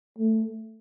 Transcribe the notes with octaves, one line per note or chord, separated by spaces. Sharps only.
A3